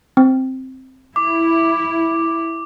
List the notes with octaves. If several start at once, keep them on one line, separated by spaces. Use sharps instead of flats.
C4
E4 D6